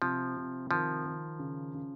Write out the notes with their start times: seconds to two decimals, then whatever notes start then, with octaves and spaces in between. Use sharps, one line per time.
0.02 C3 F3
0.37 C3
0.71 D#3 F3
1.05 D#3
1.39 C#3
1.74 C#3